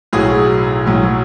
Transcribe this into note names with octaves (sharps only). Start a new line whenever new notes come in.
B1 A2 F#3 G#4
B1 A2 F#3